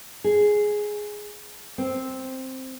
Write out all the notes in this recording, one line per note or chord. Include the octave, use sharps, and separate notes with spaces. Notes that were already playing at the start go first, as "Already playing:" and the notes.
G#4
C4